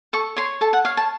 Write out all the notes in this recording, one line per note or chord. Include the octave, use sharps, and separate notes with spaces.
A4 C#6
C#5 C6
A4 A5
F#5
C#5 F5
A5